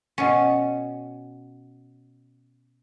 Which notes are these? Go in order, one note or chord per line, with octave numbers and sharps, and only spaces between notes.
B2 C#4